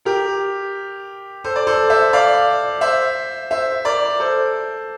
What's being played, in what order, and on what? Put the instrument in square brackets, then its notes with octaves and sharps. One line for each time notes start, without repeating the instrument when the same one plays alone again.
[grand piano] G4 A#4
A4 C5
D5
A4 C5
C5 E5
D5 F5
C5 E5
C5 E5
A#4 D5
A4 C5